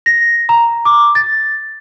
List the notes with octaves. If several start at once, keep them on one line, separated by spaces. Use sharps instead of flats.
A#6
A#5
D6
A6